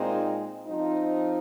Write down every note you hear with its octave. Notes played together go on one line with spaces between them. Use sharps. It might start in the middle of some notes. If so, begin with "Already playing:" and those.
Already playing: A#2 G#3 C4 D#4
F3 C4 D#4